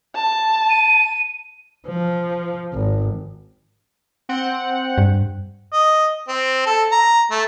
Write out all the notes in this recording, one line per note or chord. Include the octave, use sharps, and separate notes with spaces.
A5
D#7
F3
G#1
C4 F#5 G5
G2
D#5
C4
A4
A#5
A3